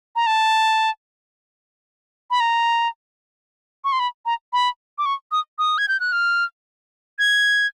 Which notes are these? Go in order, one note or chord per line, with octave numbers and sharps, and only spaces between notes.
A#5
A5
B5
A#5
C#6
C6
B5
A#5
B5
D6
C#6
D#6
D#6
G#6
G6
F#6
F6
G#6